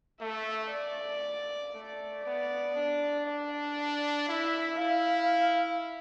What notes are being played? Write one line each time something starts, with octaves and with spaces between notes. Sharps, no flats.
A3 E5
D5
A3
B3 D5
D4
D5
E4 E5
E4 F5